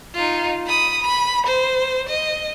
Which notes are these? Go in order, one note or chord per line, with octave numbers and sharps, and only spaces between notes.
D#4 F4
B5 D#6
B5
C5
D#5